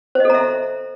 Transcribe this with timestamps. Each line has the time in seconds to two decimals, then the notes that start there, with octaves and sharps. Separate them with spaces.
0.15 C5
0.20 D#5
0.25 A4
0.30 A#5
0.35 E5